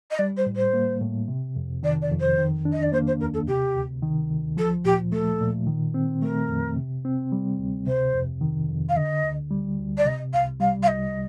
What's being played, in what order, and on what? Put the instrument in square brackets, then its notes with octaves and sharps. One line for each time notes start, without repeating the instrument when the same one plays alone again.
[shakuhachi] D#5
[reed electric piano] G3 [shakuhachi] D5
[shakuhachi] C5
[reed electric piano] A2
[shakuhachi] C5
[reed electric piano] A#3
A2
C3
F2
[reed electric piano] D#3 [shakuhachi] D5
[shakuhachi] D5
[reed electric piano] F2
[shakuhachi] C5
[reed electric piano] D#3
D4
[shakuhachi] D#5
D5
[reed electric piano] A#3 [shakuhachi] C5
[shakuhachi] C5
[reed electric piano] D#2 [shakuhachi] A#4
[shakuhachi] A4
[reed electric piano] C3 [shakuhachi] G4
[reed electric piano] D2
D#3
D2
[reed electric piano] F3 [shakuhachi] A4
[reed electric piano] A#2 [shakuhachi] G4
[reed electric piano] A3 [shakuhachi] A4
[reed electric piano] A#2
D#3
C4
[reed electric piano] A3 [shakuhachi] A#4
[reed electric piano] F2
C3
C4
G3
D2
[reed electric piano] C3 [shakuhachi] C5
[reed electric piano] F2
D#3
F2
[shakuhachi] F5
[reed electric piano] D3 [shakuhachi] D#5
[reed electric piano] D2
G3
D2
[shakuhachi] D5
[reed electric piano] C3 [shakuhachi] D#5
[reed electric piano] C2 [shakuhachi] F5
[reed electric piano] G3 [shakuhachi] F5
[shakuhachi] F5
[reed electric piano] C2 [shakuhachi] D#5